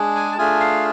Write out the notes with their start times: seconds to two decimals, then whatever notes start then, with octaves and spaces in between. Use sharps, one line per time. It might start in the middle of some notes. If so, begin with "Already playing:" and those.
Already playing: G#3 D4 G#4
0.16 G#5
0.32 A5
0.38 A3 D4 F4 G#4 G#5
0.60 F5